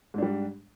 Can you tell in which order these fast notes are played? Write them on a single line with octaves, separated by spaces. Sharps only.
G#2 D4 G3